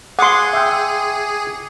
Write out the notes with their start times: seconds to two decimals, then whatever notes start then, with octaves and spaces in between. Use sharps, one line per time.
0.19 G#4 F#5 C6 D6 D#6 C#7
0.53 E5 G5